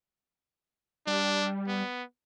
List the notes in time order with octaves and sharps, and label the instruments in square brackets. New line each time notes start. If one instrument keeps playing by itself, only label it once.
[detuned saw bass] G3 [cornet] D4
[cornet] B3